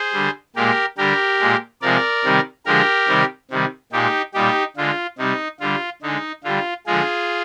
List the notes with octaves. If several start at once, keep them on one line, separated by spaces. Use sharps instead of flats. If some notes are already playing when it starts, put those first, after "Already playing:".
Already playing: G#4 C5
D3 G3
A#2 G#3 G4 A#4
D3 G3 G4 A#4
A#2 G#3
C3 F3 G#3 A#4 D5
C3 D#3 G3
D3 F3 G#3 G4 A#4
C3 D#3 G3
C3 D#3 G3
A#2 G#3 D#4 G4
A#2 G3 D#4 G4
D3 G#3 F4
C3 G3 D#4
D3 G3 F4
D3 G#3 D#4
D3 G3 F4
D3 F3 G#3 F4 G#4